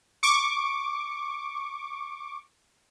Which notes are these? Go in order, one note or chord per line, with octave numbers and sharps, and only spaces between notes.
C#6 D6